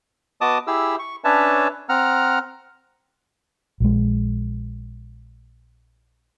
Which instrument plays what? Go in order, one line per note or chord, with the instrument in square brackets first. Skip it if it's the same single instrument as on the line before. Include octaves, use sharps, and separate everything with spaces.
[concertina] B3 F#4 D#5 A5 D6 D#6
E4 G4 G#4 E6
C#6
C#4 D4 B4 C#5 E5 A5
C4 F#5 A#5 F6
[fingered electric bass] A#1 G#3